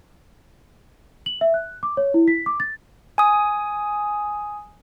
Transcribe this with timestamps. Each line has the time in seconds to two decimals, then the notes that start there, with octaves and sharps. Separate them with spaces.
1.26 F#7
1.41 E5
1.54 F#6
1.83 D6
1.97 C#5
2.14 E4
2.28 B6
2.46 D6
2.60 A6
3.18 G#5 D#6